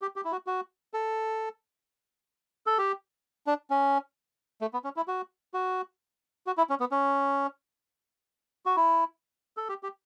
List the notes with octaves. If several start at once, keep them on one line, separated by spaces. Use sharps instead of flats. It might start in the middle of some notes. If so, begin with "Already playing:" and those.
G4
G4
E4
F#4
F#4
A4
A4
G4
D4
C#4
A3
B3
C#4
E4
F#4
F#4
F#4
E4
C#4
B3
C#4
F#4
E4
A4
G4
G4